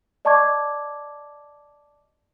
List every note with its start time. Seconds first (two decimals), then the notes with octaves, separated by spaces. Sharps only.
0.25 D5 D#5 A5 C#6 D6 G#6